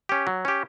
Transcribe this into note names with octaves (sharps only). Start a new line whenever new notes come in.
C#4 G4
F#3
C#4 G4